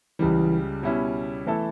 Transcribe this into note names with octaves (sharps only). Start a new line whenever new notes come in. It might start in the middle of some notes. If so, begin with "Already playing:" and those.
C#2 C#3 E3 G3
B2 G3 C#4 E4
E3 A3 E4 A4